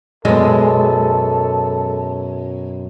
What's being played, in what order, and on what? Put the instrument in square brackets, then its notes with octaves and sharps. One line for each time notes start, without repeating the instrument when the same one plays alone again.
[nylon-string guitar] F#2 B2 [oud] G#3 [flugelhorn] A4